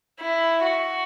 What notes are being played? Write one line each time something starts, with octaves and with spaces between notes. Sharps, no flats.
E4
F#4